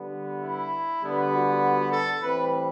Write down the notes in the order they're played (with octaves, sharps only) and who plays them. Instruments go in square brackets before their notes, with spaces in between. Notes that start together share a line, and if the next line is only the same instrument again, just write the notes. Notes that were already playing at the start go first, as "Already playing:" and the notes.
Already playing: [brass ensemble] D3 G3 B3
E4
D3 G3 B3
F#4
A4
A2 E3 G3 C4 B4